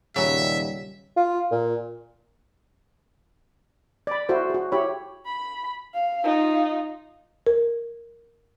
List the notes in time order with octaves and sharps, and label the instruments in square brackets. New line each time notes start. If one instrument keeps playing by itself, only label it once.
[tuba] D#1 [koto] C#3 F#3 [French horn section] G3 [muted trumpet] E5
[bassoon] F4
A#2
[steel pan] D5 B5
E4 F#4 A4 C5 F5
F#4 G#4
E4 G4 C#5 B5
[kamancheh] B5
F5
D#4 F4
[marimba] A#4